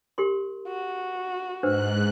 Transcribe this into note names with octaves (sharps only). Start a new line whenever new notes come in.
G4 A#4 C6
F#4
G#2 D4 B4 C5 F#6